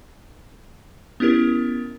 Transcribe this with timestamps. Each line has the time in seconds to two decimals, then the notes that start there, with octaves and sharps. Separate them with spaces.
1.20 B3 C#4 E4 G4 A#4